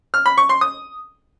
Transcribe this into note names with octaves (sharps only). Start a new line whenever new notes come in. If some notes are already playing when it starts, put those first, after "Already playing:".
F6
B5
C#6
C6
D#6